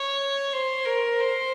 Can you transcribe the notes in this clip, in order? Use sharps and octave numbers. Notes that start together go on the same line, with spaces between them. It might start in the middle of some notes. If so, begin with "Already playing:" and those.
Already playing: C#5
C5
A#4
C5